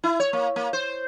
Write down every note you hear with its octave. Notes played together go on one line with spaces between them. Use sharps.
E4
C#5
A#3
A#3
C5